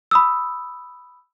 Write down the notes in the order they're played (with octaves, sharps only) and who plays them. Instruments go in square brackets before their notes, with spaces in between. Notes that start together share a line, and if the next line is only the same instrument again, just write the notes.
[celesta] B5 D#6 E6